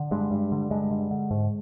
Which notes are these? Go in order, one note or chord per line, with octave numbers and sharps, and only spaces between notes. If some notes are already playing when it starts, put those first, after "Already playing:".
Already playing: D3
G2 G#3
G2
D3
G2 G#3
D3
D3
G#2